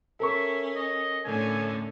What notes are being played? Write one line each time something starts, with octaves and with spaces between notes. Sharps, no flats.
C#4 A4 A#4 E5 C#6
D#5
A2 D3 C#4 G#5